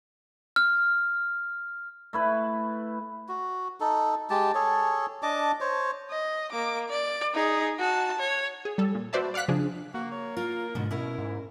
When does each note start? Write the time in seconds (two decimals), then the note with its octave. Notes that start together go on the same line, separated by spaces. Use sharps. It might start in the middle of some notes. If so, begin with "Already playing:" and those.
0.56 F6
2.13 A3 E4 B4
3.28 F#4
3.80 D#4 A4
4.30 G#3 G4 A5
4.55 G#4 A4 C#5
5.23 D4 D#5 A5 D6
5.61 C5 C#5
6.10 D#5
6.52 A#3 D6
6.89 D5
7.34 D#4 G#4
7.79 F#4 A5
8.19 C#5
8.65 G#4
8.78 G3 A4
8.95 A#2
9.13 F#4 B4 C5 D5 E5 A5
9.34 D5 F5 F#5 F#6 B6
9.48 C#3 F3 D4 G#4
9.94 A#3 F#4
10.12 C#5
10.37 F4 A#4
10.75 G#2 B2 D3
10.91 B2 C#4 E4 A#4
11.18 G#2